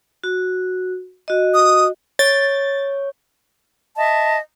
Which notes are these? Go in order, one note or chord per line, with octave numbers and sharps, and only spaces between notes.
F#4
F#4 D#5
D#6
C#5 A6
D#5 E5 A5